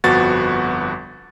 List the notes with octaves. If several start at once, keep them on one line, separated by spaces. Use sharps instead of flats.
G1 F2 B3 F#4 A6